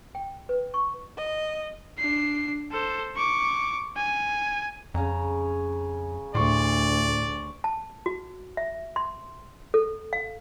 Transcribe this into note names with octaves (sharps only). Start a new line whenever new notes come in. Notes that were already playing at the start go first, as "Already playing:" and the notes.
G5
B4
C#6
D#5
D4 C7
A4 C5
C#6 D6
G#5
F2 C#3 G#5 A#5
D2 A2 D5 C6 C#6
A5
F#4
E5
C6
A4
F5